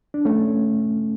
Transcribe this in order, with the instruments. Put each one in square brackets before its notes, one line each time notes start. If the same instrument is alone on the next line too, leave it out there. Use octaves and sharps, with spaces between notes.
[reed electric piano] D4
A3 C#4